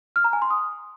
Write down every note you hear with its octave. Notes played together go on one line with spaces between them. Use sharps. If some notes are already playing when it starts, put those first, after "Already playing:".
F6
A#5
G#5
C6
D#6